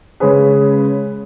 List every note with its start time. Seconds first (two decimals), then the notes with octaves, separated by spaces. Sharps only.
0.20 C#3 G#3 C#4 G#4 B4